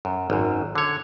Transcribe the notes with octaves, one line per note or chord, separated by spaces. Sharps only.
F#2
G#1 F#2
D3 C#5